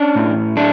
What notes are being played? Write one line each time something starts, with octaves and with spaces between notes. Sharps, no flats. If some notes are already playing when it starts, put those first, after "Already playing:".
Already playing: C#4 D4
A2
A3 D4